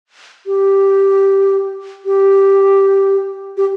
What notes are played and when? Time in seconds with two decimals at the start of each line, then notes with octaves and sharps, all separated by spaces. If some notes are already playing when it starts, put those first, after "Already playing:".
0.47 G4
2.06 G4
3.57 G4